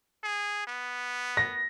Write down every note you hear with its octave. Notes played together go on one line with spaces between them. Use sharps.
G#4
B3
A#6